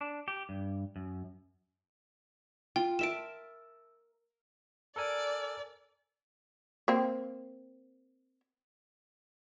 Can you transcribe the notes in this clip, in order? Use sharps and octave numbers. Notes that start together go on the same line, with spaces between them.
D4
G4
G2
F#2
F4 G5
A#4 E5 A5 D7 E7
A4 A#4 D5 G#5
A#3 C4